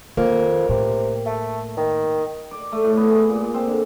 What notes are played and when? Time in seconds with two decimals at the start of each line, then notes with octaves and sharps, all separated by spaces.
0.17 F2 D#3 A#3
0.69 A2 C3
1.26 A3
1.77 D#3
2.51 D5
2.72 A3
2.85 A2
2.97 B3
3.11 G#4
3.29 A#2
3.42 A#2
3.54 C4
3.68 D3